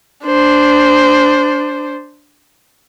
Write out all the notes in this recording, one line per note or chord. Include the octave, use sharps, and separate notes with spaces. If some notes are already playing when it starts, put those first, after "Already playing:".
D4 C5